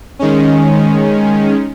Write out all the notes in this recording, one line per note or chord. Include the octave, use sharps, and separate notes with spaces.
D#3 G#3 C#4